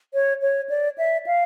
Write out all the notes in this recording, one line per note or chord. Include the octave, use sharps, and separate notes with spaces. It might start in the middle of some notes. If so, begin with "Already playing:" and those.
C#5
C#5
D5
E5
F5